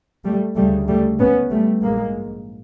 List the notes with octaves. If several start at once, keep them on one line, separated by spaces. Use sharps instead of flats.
G3 A3
D2 C#3 G3 A3
G3 A3
B3 C#4
G3 A3
A#1 G#2 G#3 A#3